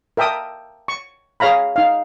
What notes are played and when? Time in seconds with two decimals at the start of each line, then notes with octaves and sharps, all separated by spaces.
0.17 A#4 E5 G5 A5 D#6
0.88 C#6
1.40 G#4 C#5 F5 A#5 B5
1.76 D#4 F5